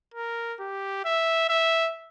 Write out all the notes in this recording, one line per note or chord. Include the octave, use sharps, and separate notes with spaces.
A#4
G4
E5
E5